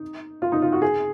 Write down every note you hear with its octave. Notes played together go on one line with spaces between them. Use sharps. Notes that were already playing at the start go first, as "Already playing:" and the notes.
Already playing: D#4
F4
D#4
F4
F#4
G#4